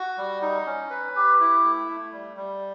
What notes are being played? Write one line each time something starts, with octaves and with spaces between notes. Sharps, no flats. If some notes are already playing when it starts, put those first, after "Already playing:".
Already playing: F#4
G3
D#4
C#4
B4
G4
E4
A3
A3
G3
G3